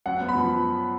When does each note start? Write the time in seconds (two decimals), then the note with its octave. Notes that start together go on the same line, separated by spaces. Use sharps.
0.06 F#2 F#5
0.21 B3
0.29 B5
0.35 F3